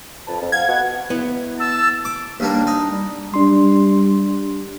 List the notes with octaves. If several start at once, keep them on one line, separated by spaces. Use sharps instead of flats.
F2 B4 A5
F2
F5 F#5 G#6
B2 F#5
B3 E4
A5 E6
D6
D#2 G3 A#3 D4
D#4
G3
G3 D4 C6